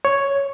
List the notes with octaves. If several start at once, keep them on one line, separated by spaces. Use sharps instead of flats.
C#5